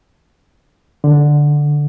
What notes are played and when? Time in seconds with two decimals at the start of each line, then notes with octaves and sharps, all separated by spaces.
1.04 D3